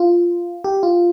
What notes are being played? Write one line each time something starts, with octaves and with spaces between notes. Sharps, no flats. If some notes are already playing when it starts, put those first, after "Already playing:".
Already playing: F4
G4
F4